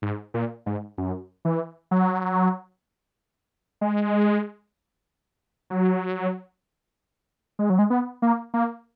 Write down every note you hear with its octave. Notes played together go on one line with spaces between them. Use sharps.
G#2
A#2
G#2
F#2
E3
F#3
G#3
F#3
G#3
F#3
G#3
B3
A#3
A#3